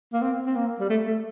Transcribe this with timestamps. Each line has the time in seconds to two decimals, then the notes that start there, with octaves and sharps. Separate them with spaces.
0.13 A#3
0.22 C4
0.46 C4
0.56 A#3
0.80 G3
0.90 A3
1.07 A3